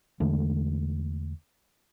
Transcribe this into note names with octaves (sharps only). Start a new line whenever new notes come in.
E2 D3 G#3 A3